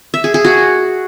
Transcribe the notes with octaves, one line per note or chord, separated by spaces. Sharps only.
E5
G#4
G#4
F#4